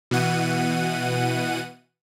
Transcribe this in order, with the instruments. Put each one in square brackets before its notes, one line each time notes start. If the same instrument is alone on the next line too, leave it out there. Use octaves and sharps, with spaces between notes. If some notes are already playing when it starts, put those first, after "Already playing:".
[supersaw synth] B2 E3 F#5 D#7